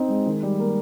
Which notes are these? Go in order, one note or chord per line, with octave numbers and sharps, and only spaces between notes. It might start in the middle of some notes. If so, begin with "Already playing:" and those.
Already playing: C4 D#4
G#3
D#3
G3
A#3